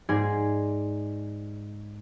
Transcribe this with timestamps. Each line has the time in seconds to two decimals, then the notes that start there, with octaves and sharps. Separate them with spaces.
0.09 G#2 D#4 G#4 D5 G#5 C6